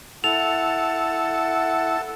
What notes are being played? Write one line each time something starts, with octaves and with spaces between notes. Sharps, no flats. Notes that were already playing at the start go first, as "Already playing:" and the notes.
E4 A4 F#5 E6 F7